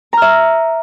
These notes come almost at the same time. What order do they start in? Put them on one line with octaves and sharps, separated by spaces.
A#5 F6 E5